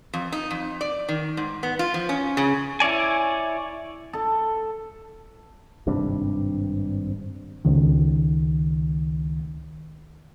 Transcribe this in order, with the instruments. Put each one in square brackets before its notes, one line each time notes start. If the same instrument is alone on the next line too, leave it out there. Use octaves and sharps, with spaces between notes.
[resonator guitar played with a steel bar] F2
D#4
F2
D5
D#3
G#2
B3
F4
F3
C#4
C#3
[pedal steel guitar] E4 C#5 D5 G#5
[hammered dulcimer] A4
[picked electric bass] G#1 G2 C3 D4
[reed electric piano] C#2 D#3